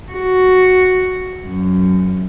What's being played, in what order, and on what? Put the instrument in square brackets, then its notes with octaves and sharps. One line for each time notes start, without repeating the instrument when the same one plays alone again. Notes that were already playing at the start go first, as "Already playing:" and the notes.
[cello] F#4
F#2